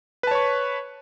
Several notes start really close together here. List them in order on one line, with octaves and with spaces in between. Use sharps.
B4 A5 C#5 C#6